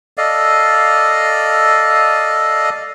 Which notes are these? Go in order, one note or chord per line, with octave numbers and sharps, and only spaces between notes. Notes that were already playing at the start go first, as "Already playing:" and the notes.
A4 D5 D#5 F5